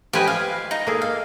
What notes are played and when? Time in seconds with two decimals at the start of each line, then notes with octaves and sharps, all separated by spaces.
0.13 F3 G4 B4 D#5 G#5
0.28 F5
0.71 D#4
0.87 A#3 G#4 A4
1.02 F5